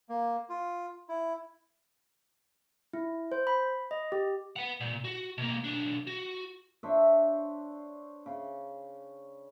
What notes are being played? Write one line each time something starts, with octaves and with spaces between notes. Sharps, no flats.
A#3
F4
E4
E4
C5
B5
D#5
G4
B4 F#5
A#2
F#4
B2 A#3
B1 D4
F#4
D4 C5 C#5 E5
C#3